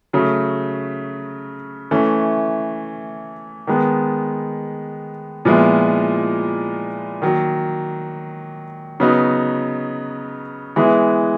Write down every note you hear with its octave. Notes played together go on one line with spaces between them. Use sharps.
C#3 F#3 A3
E3 A3 C#4
D#3 G#3 B3
A#2 F3 G#3 B3 E4
D#3 F#3 A#3
C#3 F#3 B3 D#4
E3 G#3 B3 E4